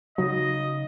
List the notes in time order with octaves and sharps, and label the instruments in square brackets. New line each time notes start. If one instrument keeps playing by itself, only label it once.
[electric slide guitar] C#3 D#4 [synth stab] F#3 [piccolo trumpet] D#5